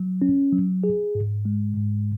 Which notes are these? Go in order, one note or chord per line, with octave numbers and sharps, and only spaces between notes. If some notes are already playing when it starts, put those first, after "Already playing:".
Already playing: F#3
C#4
F#3
G#4
G#2
G#3
G#2